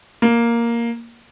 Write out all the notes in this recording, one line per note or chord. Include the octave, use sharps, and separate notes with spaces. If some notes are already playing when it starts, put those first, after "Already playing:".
A#3